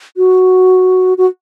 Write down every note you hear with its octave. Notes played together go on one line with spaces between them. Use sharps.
F#4
F#4